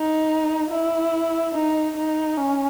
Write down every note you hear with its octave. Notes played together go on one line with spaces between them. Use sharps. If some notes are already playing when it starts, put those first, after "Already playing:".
Already playing: D#4
E4
D#4
D#4
C#4